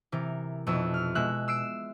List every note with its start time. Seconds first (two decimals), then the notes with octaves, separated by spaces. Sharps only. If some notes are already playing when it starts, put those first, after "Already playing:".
0.12 C3 E3 A#4
0.67 F1 F2 B2 E6
0.94 F6
1.15 B2 G#3 E5 F#6
1.48 E6 C7 D7 E7